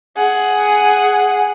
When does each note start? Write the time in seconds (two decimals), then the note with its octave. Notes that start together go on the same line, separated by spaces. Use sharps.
0.17 G#4 F#5